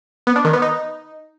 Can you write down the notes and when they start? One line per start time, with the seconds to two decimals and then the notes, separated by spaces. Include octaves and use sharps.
0.27 B3
0.36 D4
0.44 D#3
0.53 B3
0.62 D#4